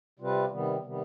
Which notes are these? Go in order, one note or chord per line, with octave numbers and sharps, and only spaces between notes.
C3 G3 C4 F4 B4
C3 D#3 G3 B3
C3 D#3 G3 B3